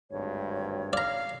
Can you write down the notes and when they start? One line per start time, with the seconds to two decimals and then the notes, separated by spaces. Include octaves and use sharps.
0.10 G#1 D2 G2 C#5
0.93 D5 F5 A#5